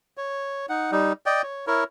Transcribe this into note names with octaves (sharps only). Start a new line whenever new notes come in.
C#5
D#4 F#5
G3 D#4
D5 D#5 G5
C#5
E4 A#4 C#5